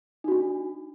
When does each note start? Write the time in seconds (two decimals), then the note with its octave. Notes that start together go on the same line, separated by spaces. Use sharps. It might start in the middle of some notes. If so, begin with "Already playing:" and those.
0.24 D#4
0.28 F#4
0.32 D4